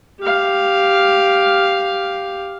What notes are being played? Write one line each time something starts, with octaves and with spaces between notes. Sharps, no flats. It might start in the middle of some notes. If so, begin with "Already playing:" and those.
G4 F5